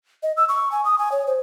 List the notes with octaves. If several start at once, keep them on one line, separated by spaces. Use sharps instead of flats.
D#5
E6
C#6
G#5
D#6
G#5
C#5
C5